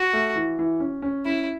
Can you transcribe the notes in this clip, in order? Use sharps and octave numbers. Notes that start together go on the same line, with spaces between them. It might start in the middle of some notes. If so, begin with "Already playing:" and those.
Already playing: F#4
A3
E3
E3
C#4
C#4
C#4 E4